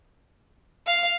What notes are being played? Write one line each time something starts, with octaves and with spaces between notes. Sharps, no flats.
F5